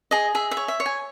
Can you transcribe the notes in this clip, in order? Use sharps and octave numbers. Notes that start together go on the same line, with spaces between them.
G#4 D#5
G#4 E5
E5
C#5
E5
C#5
G#5